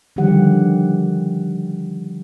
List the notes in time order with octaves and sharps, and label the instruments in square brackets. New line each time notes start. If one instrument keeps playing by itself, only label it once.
[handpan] D3 D#3 F3 G3 G4 F#5